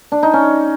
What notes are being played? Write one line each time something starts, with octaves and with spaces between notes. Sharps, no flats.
D4
D#4
C#4